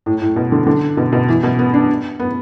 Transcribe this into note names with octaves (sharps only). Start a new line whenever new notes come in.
A2
A2
B2
D3
D3
B2
B2
E3
B2
B3
D4
B3